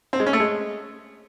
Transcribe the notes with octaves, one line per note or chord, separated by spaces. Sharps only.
C4
G#3
C#4
A3
G#3